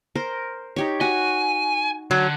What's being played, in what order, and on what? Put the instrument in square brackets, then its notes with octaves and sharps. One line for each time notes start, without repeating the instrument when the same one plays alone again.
[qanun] A#4 C5
D#4 G4 C#5
[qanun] F#4 [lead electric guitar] G#5
[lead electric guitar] D3 [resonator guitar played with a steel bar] F#3